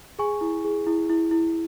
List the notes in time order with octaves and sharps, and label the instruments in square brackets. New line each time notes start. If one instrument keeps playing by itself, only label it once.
[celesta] G#4 G#5 C#6
E4
G#4
E4
E4
E4